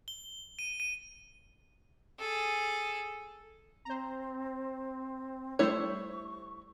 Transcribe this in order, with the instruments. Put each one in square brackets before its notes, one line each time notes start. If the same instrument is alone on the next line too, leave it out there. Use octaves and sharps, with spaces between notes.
[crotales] G7
D#7
D#7
[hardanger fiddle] G#4 A4
[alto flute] C4 [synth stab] C5 A#5
[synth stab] G3 A3 C5 [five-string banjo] E4 C#5 [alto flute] C#6